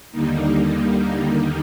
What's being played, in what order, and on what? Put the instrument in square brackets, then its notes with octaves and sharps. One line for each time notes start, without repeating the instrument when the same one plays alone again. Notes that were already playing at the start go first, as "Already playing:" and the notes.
[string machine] D#2 D3 G3 A#3 D#4